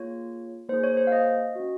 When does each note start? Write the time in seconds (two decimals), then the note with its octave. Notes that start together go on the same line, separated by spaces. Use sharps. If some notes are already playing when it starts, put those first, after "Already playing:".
Already playing: A#3 F4 G#4 C#5
0.69 A#3 D#4 G#4 C5
0.84 C#5
0.97 C5
1.07 F5
1.12 D#5
1.55 C#4 F#4